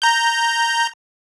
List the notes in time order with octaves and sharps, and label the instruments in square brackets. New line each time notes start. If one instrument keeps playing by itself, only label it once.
[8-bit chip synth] A#5 G6